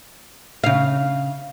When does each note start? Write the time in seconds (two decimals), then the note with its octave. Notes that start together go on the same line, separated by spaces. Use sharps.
0.64 C#3 F5